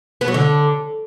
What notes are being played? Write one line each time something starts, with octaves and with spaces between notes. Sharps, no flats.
B3
F#3
D3